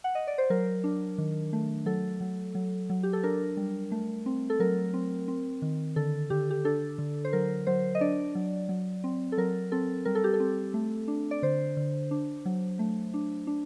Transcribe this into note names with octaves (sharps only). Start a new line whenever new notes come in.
F#5
D#5
D5
C5
F#3 A#4
D4
D#3
A3
F#3 A4
F#3
F#3
F#3
G4
A4
D4 A#4
G3
A3
C4
A4
F#3 A#4
C4
C4
D#3
D3 A4
D3 G4
G4
D4 A4
D3
C5
F#3 A#4
F#3 C5
D#5
D4 D5
F#3
F#3
C4
A4
F#3 A#4
C4 A4
G3 A#4
A4
G4
A4
C4
A3
D4
D5
D3 C5
D3
D4
F#3
A3
D4
D4